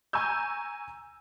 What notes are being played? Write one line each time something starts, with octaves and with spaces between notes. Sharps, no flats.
G#5 A#5 C#6 E6 G6